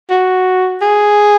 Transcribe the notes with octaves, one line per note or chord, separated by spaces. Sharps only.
F#4
G#4